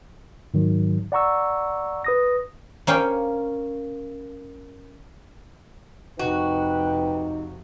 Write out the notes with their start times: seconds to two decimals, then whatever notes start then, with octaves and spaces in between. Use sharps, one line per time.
0.54 G#2 D#3 F#3
1.12 D5 F#5 A#5 C#6 E6
2.04 B4 D#6 A#6
2.87 A#3 C#4 F5 G5
6.19 F2 C3 D#4 F#4 B4 G5